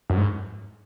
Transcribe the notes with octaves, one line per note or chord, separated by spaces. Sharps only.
F#2
G#2